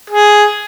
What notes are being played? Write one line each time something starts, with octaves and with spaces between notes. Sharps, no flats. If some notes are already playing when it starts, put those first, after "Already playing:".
G#4